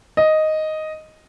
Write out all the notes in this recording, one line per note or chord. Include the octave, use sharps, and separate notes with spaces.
D#5